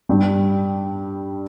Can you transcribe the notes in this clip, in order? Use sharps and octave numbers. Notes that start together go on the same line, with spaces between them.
G2 G3 D4 G4